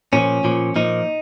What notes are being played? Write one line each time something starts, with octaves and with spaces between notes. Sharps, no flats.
A#2 F3 C#4
A#2 F3
A#2 F3 D#4